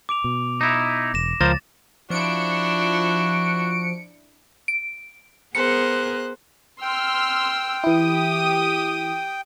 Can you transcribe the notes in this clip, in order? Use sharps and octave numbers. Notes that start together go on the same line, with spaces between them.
D6 D7 F7
B2
D#4 E4
E1 A#6 E7
C#2 F3 A#4 C5 A6
F3 D4 E4 F#4 C#7 D7
D7
B3 G#4 A#4 C5 F#6 C#7
G5 C6 E6 F6
E3 E4 G4 D#6